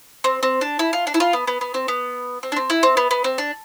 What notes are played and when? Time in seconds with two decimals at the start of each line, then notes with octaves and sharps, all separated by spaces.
0.24 C4
0.43 C4
0.61 D4
0.79 E4
0.93 F4
1.07 D4
1.14 E4
1.20 F4
1.33 B3
1.47 B3
1.61 B3
1.74 C4
1.88 B3
2.43 C4
2.52 D4
2.56 C4
2.70 E4
2.83 C4
2.97 B3
3.11 B3
3.24 C4
3.38 D4